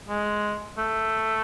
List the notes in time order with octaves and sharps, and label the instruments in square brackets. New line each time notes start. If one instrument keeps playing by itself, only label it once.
[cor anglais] G#3
A3